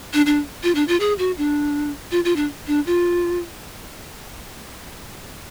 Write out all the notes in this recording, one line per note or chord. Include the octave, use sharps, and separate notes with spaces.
D4
D4
F4
D4
F4
G#4
F#4
D4
F4
F4
D4
D4
F4